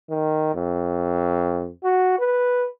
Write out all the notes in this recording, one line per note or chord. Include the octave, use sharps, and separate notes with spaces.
D#3
F2
F#4
B4